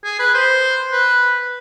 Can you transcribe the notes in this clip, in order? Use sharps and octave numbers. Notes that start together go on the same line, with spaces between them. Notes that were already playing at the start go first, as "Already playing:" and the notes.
G#4
B4
C5
B4